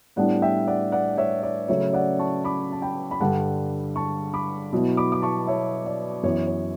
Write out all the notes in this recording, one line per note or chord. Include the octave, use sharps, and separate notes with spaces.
A2 G3 B3 D4 D5 F#5
E5 G5
D5 F#5
D5 F#5
C#5 E5
D5
C#3 F#3 A3 C#4 C#5 E5
D5 F#5
A5 C#6
B5 D6
A5
G5 B5
B5
G2 D3 G3 D4 F#5 A5
A5 C#6
B5 D6
B2 F#3 B3 E4
B5 D6
D6
A5 C#6
C#5 E5
D5
F#2 E3 B3 C#5
C#5